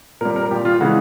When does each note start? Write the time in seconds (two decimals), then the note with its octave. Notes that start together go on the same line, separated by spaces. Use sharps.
0.21 A#2 A#4
0.25 G3
0.36 A#4
0.51 A#2 G4
0.55 G3
0.65 F4
0.80 C#3 E3 G#3 F#4